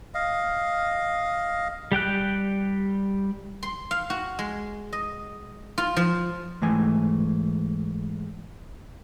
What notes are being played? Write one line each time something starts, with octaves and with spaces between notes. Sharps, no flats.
D#5 F5
G3 G4 G5 F#6
C6
F5
F#4
G#3
D#5
F4
F3
G#2 E3 A3 G#5